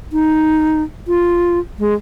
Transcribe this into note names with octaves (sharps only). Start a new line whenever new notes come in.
D#4
F4
G#3